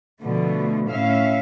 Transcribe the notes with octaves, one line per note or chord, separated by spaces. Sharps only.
B2 D3 F3 A3
A2 C#4 E5 F5